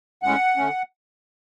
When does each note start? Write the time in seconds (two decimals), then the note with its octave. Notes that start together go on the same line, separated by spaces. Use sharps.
0.23 A2 G#3 C#4 F#5
0.57 D3 A3 C#4